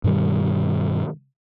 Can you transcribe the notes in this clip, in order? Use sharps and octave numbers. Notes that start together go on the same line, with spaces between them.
G2 B2 D#3 G3